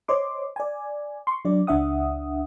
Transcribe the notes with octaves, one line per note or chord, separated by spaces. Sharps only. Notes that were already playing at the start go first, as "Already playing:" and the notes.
C5 C#5 D#5 C6 D6
D5 G#5
C6 C#6
F#3 D4 D5
C#2 D4 E5 F#5 D#6